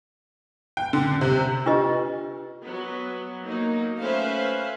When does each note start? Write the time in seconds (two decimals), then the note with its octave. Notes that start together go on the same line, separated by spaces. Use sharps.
0.77 G5
0.93 D3
1.21 C3
1.66 D4 F4 G4 B4 D#5
2.64 F#3 B3
3.44 F#3 A#3 D#4
4.00 A3 C#4 B4 C5 E5 F5